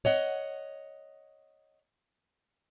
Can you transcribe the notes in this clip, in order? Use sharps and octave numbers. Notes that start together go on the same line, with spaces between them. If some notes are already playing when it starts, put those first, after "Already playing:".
C#5 D#5 F#5